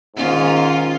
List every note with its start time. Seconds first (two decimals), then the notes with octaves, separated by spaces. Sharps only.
0.16 G#2 D#3 C#4 F4